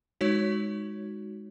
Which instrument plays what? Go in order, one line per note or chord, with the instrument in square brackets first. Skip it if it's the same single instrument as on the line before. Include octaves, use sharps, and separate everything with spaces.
[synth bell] G#3 D#4 F#4 C#5